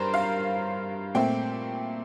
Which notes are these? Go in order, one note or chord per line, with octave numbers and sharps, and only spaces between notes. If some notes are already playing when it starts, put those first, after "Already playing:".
Already playing: G2 G3 A#4 C5
F5
A#2 A3 C4 G5